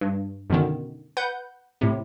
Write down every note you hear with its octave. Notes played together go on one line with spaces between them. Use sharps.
G2
F#2 B2 D3 D#3
B4 F#5 G6
A2 C3